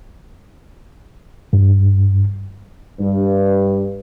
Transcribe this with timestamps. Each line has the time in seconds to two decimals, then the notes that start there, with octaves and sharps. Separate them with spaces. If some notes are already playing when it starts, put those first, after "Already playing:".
1.53 G2
3.00 G2